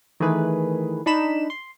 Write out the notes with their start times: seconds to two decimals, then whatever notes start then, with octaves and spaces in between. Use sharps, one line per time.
0.20 D#3 E3 A3 G#4 B4
1.06 D4 D#4 B5 E7
1.50 C6